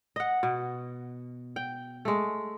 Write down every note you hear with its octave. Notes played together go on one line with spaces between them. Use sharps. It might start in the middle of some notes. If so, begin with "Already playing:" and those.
D#5 F#5
B2
G5
G#3 A3